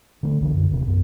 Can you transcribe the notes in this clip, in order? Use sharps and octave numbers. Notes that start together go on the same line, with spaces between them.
D3 G#3 A3
C2 D3 E3
F#2 D3
D#1 D#2 C3
B1 F#2